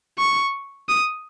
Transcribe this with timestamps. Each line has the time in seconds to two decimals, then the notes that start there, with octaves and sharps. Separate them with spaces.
0.19 C#6
0.88 D#6